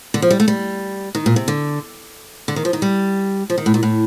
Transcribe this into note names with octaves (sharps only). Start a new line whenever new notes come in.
D3
F3
G3
A3
G3
D#3
A#2
C3
D3
D3
D#3
F3
D#3
G3
F3
D#3
A2
A#2
A2